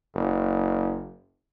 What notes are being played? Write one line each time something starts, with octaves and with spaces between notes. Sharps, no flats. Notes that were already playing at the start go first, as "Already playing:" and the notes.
F#1